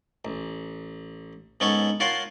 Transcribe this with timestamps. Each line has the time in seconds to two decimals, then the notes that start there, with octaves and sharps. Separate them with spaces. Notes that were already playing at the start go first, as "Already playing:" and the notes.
0.25 A1
1.60 G#2 B3 C#4 A4 C#5
2.00 F4 A#4 C#5 F#5 A5 C6